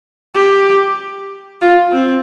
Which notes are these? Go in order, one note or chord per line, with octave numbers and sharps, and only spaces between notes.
G4
F4
C4